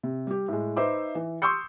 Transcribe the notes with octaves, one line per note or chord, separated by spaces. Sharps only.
C3
G3 G4
A2 G#3
D#4 B4 C5 E5 D6
E3
C6 C#6 D#6 E6 G6 C#7